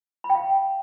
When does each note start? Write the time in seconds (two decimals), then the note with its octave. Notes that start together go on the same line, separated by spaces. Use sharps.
0.24 B5
0.30 G5
0.35 F5